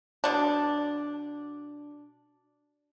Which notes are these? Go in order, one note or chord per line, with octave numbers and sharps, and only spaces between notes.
B2 D4